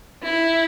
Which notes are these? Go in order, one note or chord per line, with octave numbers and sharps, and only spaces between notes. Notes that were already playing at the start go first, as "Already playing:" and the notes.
E4